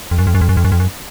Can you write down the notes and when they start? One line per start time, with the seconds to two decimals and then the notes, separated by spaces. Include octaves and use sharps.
0.11 F2
0.18 F#2
0.27 F2
0.35 F#2
0.41 F2
0.49 F#2
0.57 F2
0.64 F#2
0.72 F2
0.80 F#2